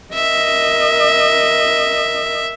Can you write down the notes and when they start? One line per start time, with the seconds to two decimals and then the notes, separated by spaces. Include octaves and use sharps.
0.14 A#4 D#5 E5